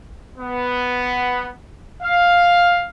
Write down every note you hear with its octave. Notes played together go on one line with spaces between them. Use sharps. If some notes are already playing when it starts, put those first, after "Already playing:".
B3
F5